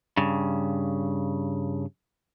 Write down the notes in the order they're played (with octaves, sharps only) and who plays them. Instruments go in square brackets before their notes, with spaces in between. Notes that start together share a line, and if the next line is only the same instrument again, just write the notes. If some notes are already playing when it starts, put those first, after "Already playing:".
[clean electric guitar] G2 C#3